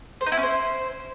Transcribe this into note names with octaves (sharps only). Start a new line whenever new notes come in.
C5
D#4
E4
C#4
C5